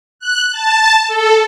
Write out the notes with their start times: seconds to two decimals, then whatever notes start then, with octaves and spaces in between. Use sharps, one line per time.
0.19 F#6
0.51 A5
1.07 A4